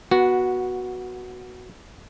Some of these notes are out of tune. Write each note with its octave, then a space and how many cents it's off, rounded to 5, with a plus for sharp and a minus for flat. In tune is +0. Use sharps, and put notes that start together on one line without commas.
B3 -20 F#4 +0